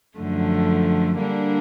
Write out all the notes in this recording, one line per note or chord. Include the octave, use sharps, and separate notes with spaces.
F#2 D3 F3 A3
D3 G3 A#3 D4